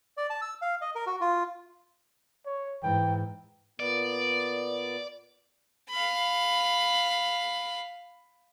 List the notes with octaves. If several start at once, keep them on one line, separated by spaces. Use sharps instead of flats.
D5
A5
E6
F5
D#5
A#4
F#4
F4
C#5
G#2 E3 G5
A#2 B3 D5
F5 B5